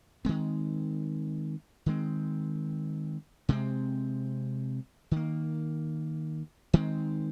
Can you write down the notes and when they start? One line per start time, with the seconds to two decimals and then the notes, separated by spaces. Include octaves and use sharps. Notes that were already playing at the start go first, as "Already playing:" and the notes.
0.25 D#3 G#3 C4
1.86 D#3 G#3 C4
3.49 C3 G#3 C4
5.11 D#3 A#3
6.73 D#3 G#3 C4